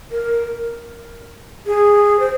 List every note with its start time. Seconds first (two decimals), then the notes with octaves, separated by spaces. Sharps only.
0.11 A#4
1.66 G#4
2.20 C5